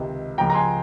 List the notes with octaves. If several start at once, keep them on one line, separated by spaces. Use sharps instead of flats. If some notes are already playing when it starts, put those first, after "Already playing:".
Already playing: C#2 C3 D#3
C#2 C#3 F3 G5 A#5
A#5
G#5 C6